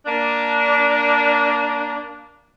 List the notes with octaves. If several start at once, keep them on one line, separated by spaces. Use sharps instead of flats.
A#3 D4